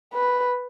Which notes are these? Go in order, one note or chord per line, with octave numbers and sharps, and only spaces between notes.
B4